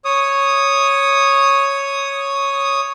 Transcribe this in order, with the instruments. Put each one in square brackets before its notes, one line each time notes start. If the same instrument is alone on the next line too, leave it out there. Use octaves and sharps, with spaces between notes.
[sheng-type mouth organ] C#5 D#6